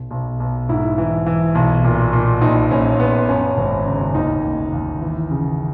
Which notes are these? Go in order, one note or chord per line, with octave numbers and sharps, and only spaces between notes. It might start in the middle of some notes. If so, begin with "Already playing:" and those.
Already playing: B1
B1
B1
G#2 E4
E3
E3
B1
A#2
A#2
A#1 D#4
A#1 C#4
A#1 B3
F#2 C#4
G#1
C#3
D#2 D#4
D#2
D#2
E3
C#3